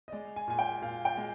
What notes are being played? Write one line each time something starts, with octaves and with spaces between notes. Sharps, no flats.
D#5
G#3 D5
G#5
A#2 G#5
G5
A#2 F5
G5
G#3